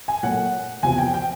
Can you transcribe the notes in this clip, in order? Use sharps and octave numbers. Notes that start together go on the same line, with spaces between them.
G#5
A#2 F#3 A3 F#5
E2 C3 F3 G#5
G5
G5